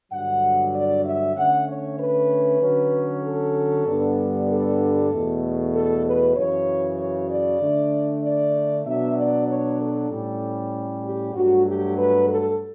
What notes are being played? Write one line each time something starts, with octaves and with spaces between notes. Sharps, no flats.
G2 D3 F#3 F#5
D5
E5
D3 A3 C#4 F#5
C#5
B4
D3 F#3 C#4
A4
G2 D3 G3 B3 D4
A4
E2 B2 A3
A4
B4
F#2 C#3 E3 C#5
C#5
D5
D3 A3 D4
D5
B2 F#3 B3 D4 E5
D5
C#5
A4
A2 G3 C#4
G4
G2 F#3 A3 F#4
G4
B4
A4